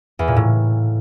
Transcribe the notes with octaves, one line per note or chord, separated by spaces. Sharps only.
E2
A#2
A2